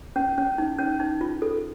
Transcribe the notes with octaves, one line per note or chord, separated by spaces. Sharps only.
C#4
C#4
D#4
C#4
D#4
F4
A4